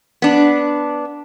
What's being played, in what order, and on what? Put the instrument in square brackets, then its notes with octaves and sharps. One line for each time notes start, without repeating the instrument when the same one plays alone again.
[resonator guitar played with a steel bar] B3 D4